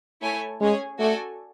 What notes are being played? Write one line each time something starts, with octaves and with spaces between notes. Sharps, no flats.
A3 E4 A4 C#5 G#5
G#3 C#4 G#4 C#5 G#5
A3 F#4 A4 D5 G#5